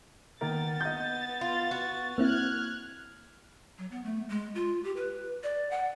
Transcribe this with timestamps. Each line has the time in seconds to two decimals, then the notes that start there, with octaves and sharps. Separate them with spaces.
0.41 D#3 A#3 B3 A#4 A6
0.81 D#5 G6
1.41 F4
1.71 F#4
2.18 A#3 C4 E4 F6 F#6 G#6
3.78 F#3
3.91 B3
4.04 A3
4.29 G#3
4.55 F4
4.84 G4
4.97 B4
5.43 D5
5.71 F#5